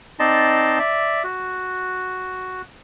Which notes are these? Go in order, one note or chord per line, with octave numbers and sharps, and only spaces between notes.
C4 D#4 D5 D#5 A5 C6
D5 E5
F#4